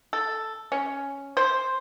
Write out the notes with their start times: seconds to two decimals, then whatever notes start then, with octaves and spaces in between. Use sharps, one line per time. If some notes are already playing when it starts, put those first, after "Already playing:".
0.13 A4
0.72 C#4
1.37 C5